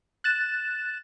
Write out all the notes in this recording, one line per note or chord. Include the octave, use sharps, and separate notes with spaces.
F#6 A6 E7